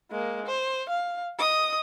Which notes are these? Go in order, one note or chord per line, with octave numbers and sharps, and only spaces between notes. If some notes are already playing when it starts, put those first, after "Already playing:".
G#3 A#3
C5
F5
D#5 D#6